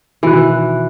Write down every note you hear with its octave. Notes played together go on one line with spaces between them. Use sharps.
B2 D#3 E3 F#4 F#6